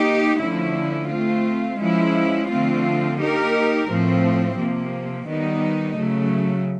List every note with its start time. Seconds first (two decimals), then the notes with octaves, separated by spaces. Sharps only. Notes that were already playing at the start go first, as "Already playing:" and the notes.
Already playing: A#3 D#4 G4
0.39 D3 F3 A3 C#4 E4
1.09 A3 C4 F4
1.79 F3 G#3 C#4 E4
2.48 D3 F3 A3 C4 F4
3.18 A#3 D#4 G4 A#4
3.87 A2 F3 A3 C4
4.57 C3 F3 A#3
5.27 D#3 G3 B3 D#4
5.96 C#3 F#3 A3